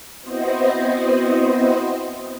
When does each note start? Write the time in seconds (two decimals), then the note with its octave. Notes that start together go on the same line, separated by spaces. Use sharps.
0.21 B3 C4 E4 F#4 C5 D#5